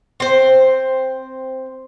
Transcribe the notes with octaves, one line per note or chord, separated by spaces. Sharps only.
C4 C5